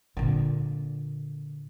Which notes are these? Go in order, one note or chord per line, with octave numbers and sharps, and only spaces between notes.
A#2 D3